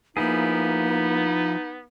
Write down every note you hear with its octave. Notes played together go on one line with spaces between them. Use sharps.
F3 A#3 B3 D#4 E4 G#4